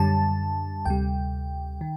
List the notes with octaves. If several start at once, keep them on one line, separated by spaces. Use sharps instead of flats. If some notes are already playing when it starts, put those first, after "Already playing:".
Already playing: F#2 D3 G3 A5
D2 C3 G3 G5
D#3